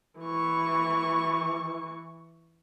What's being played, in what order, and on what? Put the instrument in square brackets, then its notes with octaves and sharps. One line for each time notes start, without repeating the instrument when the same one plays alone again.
[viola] E3 C#6